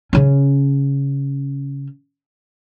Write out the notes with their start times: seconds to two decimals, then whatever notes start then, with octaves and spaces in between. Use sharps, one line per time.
0.13 C#3 C#4